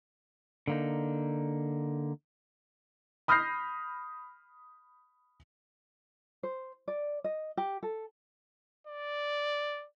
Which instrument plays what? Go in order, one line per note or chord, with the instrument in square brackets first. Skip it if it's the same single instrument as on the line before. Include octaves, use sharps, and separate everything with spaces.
[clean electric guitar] D3 A#3 D#4
[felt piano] B5 D#6 F6 G6 A#6 C7
[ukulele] C5
D5
D#5
G4
A4
[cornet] D5